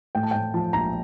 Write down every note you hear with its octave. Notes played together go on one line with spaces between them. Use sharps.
A2 G5
A5
G5
A2
F3 A5
A#1 A#5